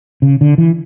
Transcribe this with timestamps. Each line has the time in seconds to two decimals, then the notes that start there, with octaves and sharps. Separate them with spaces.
0.22 C#3
0.41 D3
0.58 E3